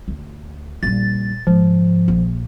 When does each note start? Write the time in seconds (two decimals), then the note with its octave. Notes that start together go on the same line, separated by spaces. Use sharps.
0.08 D2
0.83 A#1 G3 A6
1.47 G#2 C#3 F3
2.08 A#1